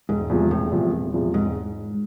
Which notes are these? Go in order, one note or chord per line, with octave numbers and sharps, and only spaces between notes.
E1 G#2
E2 C3 F3
E1 A2
E2 C3 F3
E1
E2 C3 F3
E1 G#2